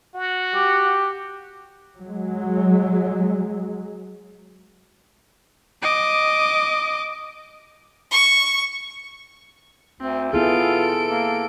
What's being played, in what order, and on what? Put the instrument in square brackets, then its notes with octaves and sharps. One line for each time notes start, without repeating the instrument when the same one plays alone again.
[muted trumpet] F#4
[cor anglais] G4
[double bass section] F#3 G#3
[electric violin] D#5 D6
[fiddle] C#6
[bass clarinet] D2 [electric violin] C4
[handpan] B3 E4 G#4 [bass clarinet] F4 [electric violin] A4 D7
[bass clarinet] A#3